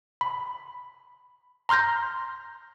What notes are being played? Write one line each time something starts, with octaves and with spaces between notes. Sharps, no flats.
B5
A#5 C6 F6 G6 A#6